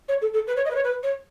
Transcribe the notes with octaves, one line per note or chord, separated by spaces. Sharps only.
C#5
A4
A4
B4
C#5
D#5
B4
C#5
B4
C#5